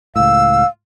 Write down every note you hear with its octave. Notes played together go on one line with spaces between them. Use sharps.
C#2 A2 F5 E6